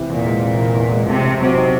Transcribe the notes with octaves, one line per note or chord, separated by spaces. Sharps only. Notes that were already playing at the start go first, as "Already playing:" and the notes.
Already playing: C3 E3
E2 A#2
G#3
C3
E3
E2
G#3
C3 A3
C4
C3 F#3
D#4